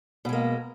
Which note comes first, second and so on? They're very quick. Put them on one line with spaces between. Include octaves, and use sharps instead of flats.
B2 G#3 A#3